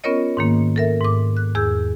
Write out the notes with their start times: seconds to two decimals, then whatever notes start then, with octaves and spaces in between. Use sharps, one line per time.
0.04 B3 C#4 F4 A#4 C#5 D#5
0.37 G#2 D#3 A#3
0.76 A4 A#4 E5
1.01 G#2 D6
1.37 F#6
1.55 E2 G#4 E6 G6